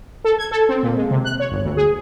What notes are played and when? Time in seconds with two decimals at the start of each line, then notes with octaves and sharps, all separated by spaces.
0.25 A4
0.39 G#6
0.51 A4
0.69 C4
0.83 A#2
0.97 G#3
1.11 C3
1.25 F#6
1.40 C#5
1.51 G1
1.65 D2
1.77 G#4